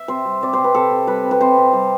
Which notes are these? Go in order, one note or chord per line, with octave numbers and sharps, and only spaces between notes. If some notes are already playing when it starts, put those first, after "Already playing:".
Already playing: E5
C3 C5
G3
C3 D5
C3 C5
B4
C3 A4
C3
G3 B4
C3
B4
C3 C5
C3
G3